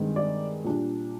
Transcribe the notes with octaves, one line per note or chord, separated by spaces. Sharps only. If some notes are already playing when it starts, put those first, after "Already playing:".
Already playing: G2 D#3 G#3 C4
D5
A#2 G3 D4